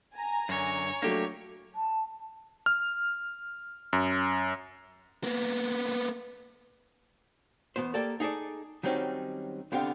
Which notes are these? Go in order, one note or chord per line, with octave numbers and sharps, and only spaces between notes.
G#5 A#5 A#6
F#2 D3 C#5
F#3 A3 A#3 D4 G4
A5
F6
F#2
A#3 B3
E2 B2 B3 B4 C5
A#3 G4 A4 A#4 D5 A5
D#4 G#4 A4 D5
D#3 F#3 G3 C4 C#4 D#4
C2 D3 B3 C4 G4 F5